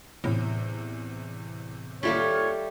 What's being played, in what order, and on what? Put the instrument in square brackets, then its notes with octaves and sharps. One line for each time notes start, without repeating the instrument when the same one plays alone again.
[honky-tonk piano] E2 C3 [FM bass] A2
[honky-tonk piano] D#2 F4 F5 [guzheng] G3 A3 G4 [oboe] C#5